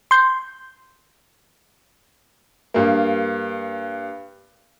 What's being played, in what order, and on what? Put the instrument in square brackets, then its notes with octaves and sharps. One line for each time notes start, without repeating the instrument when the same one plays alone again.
[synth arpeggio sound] C6 G6
[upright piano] G2 A#3